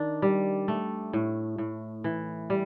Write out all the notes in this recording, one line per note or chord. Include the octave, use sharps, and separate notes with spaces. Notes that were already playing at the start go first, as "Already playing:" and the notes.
Already playing: D#3 D4
G3
A3
A2
A2
E3
G3